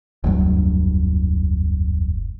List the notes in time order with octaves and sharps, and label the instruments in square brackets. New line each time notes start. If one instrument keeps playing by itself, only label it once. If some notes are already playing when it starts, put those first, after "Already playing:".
[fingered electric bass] F1 D2 G2 F#3